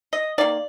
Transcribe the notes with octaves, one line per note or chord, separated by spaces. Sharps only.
D#5
D#3 A#3 D5